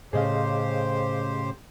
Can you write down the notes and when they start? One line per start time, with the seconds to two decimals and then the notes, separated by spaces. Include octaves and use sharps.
0.13 A2 C#3 G4 G#4 C5 D#5 F5